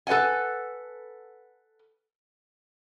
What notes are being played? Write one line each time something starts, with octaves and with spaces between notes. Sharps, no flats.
A4 B4 D#5 F#5 G#5